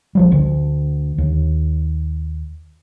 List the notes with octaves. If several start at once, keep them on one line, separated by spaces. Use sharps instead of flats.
A#1 F3 G3
D2 D3
D#2